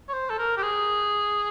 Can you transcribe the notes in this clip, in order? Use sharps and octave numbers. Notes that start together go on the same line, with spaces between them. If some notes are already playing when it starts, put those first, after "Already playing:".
C#5
C5
A4
A#4
G4
G#4